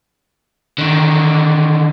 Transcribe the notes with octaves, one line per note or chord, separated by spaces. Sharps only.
D3 D#3